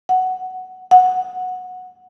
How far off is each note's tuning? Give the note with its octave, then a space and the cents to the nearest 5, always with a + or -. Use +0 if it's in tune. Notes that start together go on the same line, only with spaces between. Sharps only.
F#5 +5
F#5 -10